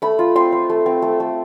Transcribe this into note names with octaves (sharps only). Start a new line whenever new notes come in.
A3 B5
F4
C4 C6
C4
A3
C4
A3
A3